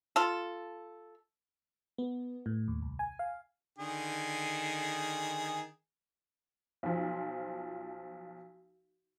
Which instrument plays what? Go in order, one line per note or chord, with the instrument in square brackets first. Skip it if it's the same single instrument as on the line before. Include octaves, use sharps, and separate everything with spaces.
[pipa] F4 A4
[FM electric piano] B3
A2
D#2
C2
G#5
F5
[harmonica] D3 D#3 G#4
[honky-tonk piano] B1 F3